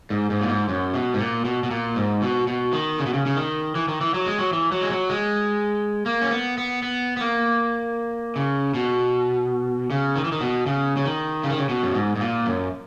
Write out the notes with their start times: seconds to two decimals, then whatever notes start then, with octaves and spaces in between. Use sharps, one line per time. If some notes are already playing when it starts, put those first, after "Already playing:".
0.10 G#2
0.30 G#2
0.41 A#2
0.49 G#2
0.69 F#2
0.94 B2
1.14 G#2
1.19 A#2
1.45 B2
1.63 B2
1.71 A#2
1.96 G#2
2.22 B2
2.47 B2
2.73 D#3
2.99 C#3
3.06 B2
3.14 C#3
3.26 C#3
3.37 D#3
3.75 E3
3.88 D#3
4.01 E3
4.14 F#3
4.26 G#3
4.39 F#3
4.53 E3
4.72 F#3
4.82 G#3
4.91 F#3
5.09 G#3
6.06 A#3
6.21 C#4
6.31 B3
6.58 B3
6.83 B3
7.17 B3
7.21 A#3
8.36 C#3
8.74 B2
9.90 C#3
10.16 D#3
10.24 E3
10.32 D#3
10.41 B2
10.66 C#3
10.97 C#3
11.06 D#3
11.43 C#3
11.51 D#3
11.58 C#3
11.69 B2
11.83 F#2
11.95 G#2
12.16 G#2
12.20 A#2
12.46 F#2